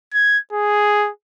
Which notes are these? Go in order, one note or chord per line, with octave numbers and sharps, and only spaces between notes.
G#6
G#4